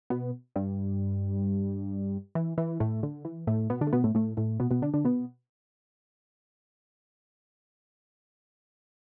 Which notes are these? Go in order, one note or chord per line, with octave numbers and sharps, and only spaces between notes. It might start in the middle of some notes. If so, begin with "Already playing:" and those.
B2 B3
G2 G3
E3
E3
A2 A3
D3
E3
A2 A3
B2 B3
D3 D4
A3
B2 B3
A2 A3
A2 A3
A2 A3
B2 B3
B2 B3
D3 D4
D3 D4
B2 B3